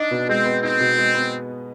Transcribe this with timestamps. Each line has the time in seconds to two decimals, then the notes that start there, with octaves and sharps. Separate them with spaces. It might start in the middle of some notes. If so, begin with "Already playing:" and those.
Already playing: D4 D#4
0.11 B2
0.29 G#3 C4
0.45 B3
0.62 C4 D#4
0.80 B2
0.98 G#3
1.14 B3